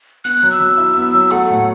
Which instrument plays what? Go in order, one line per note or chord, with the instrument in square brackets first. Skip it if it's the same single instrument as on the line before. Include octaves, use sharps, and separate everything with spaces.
[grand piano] B3 [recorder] F#6
[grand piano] F#3
[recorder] E6
[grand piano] F#3
E4
B3
F#3
[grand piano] A3 [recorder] F#5
[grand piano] A2
[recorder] F#5